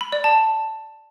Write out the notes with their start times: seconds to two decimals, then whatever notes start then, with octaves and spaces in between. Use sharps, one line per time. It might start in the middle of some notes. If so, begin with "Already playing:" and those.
0.01 B5
0.12 D5
0.24 A5